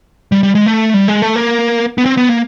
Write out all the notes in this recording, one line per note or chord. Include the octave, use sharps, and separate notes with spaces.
G3
G3
G#3
A3
G3
G#3
A3
A#3
B3
C4
B3
A#3